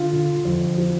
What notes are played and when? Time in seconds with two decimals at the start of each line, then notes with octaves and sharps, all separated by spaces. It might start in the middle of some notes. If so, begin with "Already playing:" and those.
Already playing: D3 F4
0.13 D3
0.45 F2
0.78 F3